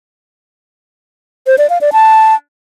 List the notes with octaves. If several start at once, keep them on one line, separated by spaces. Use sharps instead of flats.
C5
D5
F5
D5
A5